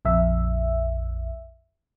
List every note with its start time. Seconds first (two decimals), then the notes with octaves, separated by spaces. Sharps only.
0.05 A#1 F2 E5